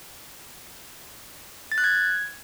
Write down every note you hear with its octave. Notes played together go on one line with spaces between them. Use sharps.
A6
F#6
G#6